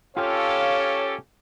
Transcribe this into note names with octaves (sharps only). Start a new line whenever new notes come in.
C#4 F4 G4 A4 C#5 F5 G5